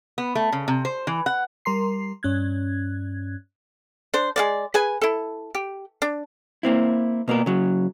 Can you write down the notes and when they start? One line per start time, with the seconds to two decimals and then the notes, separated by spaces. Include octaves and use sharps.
0.18 B3
0.35 A3
0.52 C#3
0.68 C3
0.85 C5
1.07 E3
1.26 F#5
1.65 G3 A#4 A#5 C6 C7
2.23 G2 C#4 F#6 G#6
4.14 D4 C5
4.36 G#3 B3 D5
4.74 G#4 B4 G#5
5.01 E4 A4
5.55 G4
6.02 D4
6.63 A#3 C4 E4
7.28 B2 A#3 B3 A#4
7.46 C#3 F#3